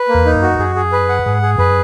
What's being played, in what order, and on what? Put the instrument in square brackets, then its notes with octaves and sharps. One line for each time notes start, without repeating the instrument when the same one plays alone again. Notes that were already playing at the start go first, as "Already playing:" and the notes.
Already playing: [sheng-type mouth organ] B4
A#3
[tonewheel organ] E2
[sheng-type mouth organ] D#4
[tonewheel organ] F#2
[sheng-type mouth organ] F#4
[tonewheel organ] F#2 [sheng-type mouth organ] G#4
[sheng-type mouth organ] G#4
B4
F#5
[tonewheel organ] G#2 [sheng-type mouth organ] G#4
[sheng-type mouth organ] G#4
[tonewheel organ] F#2 [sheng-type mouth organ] B4